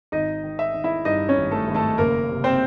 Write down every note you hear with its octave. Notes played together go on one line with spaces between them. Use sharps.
G#1 D#4 D#5
D#3
E5
D#3
E4 E5
G2 D#4 D#5
C#4 C#5
G#1
A3 A4
G#1
A3 A4
F#1 A#3 A#4
C3
C4 C5